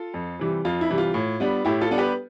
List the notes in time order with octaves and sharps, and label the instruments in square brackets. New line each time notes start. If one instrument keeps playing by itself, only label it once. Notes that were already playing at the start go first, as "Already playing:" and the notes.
Already playing: [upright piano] F4 A4
F2
C3 E3 G3
F2 F4
E4
C3 E3 G3
F4
A2
G3 B3 D4
A2 E4 G4
F4 A4
G3 B3 D4
G4 B4